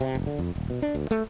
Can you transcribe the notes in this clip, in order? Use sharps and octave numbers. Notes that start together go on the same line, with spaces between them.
C3
F1
D3
F2
D#1
B2
D4
D2
A3